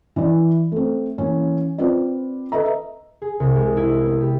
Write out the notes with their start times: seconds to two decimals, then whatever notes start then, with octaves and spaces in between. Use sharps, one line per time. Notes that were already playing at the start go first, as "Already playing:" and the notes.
0.16 E3 D5
0.72 A3 C4
1.18 E3 A#3 C#4
1.78 C4 F4 B4 D5
2.52 A4 B4 D#5 E5 A#5
3.22 G#4
3.40 C2
3.55 G#3
3.77 E4
4.06 B3
4.21 G4